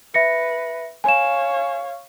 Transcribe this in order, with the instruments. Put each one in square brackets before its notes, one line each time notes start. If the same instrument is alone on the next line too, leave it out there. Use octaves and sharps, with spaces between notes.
[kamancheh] B4 [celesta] E5 A#6 C#7
[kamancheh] C#5 F5 [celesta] G#5 E7